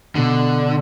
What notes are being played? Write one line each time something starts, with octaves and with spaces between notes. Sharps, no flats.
B2 D3